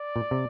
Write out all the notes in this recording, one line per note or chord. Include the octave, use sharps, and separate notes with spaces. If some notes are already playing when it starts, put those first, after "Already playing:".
Already playing: D5
A#2
C3